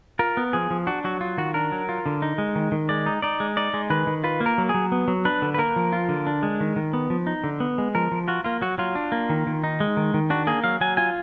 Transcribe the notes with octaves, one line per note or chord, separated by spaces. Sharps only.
F4 A#4
B3
F3 G#4
F3
D4 F#4
F#3 F#4
F4
D#3 F#4
D4 A#4
F#3
F4
D3
D#4
G#3
D#3
D#3
G#3 D5
D#4
D#4 D5
G#3
D#4 D5
G#3
D#3 B4
D#3
F4 B4
A#3
A#4
F#3
G#4
F#3
B3
F#3
D4 B4
D3
B4
A#3 A#4
F3
F4
D3
D4
G#3
D#3
D#3
B3
F3
D#4
D3
B3
G#3
F3 A#4
F3
F4 F#4
A#3 F4
F#3 F#4
F#3 F4
D4
A#3
D#3
D#3
D#4
G#3
D#3
D#3
D4 F#4
A#3 G#4
F#3 F5
F#3 G#5
F4 G#5